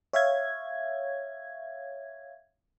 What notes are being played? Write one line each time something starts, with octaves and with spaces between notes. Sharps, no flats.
C#5 E5 F5 G#6